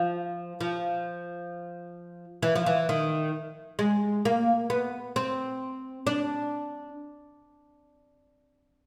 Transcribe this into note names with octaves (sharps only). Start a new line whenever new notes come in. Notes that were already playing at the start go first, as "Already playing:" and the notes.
Already playing: F3
F3
E3
F3
E3
D#3
G#3
A#3
B3
C4
D4